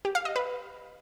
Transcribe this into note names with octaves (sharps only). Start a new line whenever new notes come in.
G4
F5
D#5
B4